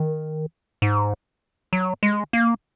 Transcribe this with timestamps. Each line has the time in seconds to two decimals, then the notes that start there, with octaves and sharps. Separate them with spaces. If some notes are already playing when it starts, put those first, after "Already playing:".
Already playing: D#3
0.82 G#2
1.73 F#3
2.03 G#3
2.33 A#3